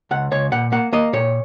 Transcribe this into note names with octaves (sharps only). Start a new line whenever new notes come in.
C#2 F#5
C#2 C#5
A#2 F#5
A#3 F#5
A#3 D#5
A#2 C#5